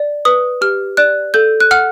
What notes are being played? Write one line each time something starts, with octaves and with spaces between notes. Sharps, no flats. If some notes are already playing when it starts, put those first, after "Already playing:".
Already playing: D5
B4 D#6
G4 F6
D5 F#6
A4 G6
F#6
F#5 F6